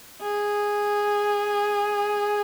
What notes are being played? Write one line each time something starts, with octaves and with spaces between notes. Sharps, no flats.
G#4